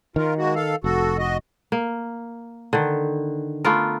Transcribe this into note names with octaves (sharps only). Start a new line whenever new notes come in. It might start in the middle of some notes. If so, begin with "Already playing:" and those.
D#3 F4 A#4
G#3 A#3 F#4
A4 F5
F1 F#4 A4
F#4 D#5
A#3
D3 D#3
A3 B3 F4 A#4